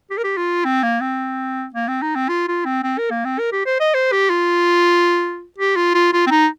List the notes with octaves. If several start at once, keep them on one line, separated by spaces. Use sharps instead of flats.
G4
A#4
G4
F4
C4
A#3
C4
A#3
C4
D#4
C4
F4
F4
C4
C4
A#4
A#3
C4
A#4
G4
C5
D#5
C5
G4
F4
G4
F4
F4
F4
C4
D#4